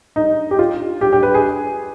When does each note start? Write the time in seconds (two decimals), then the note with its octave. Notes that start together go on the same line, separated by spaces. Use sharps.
0.16 D#4
0.51 G4
0.59 F4
1.01 G4
1.13 G4
1.23 B4
1.34 G#4